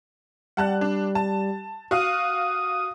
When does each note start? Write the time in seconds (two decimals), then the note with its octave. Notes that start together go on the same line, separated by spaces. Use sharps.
0.57 G3 F#5 A5 F#6
0.81 D4
1.15 A5
1.91 F#4 F5 D#6